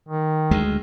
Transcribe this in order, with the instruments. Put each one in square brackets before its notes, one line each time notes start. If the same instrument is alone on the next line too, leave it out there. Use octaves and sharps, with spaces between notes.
[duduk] D#3
[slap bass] D2 G#3